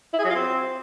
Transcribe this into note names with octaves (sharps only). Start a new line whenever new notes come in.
E4
G#4
F#3
F4
C4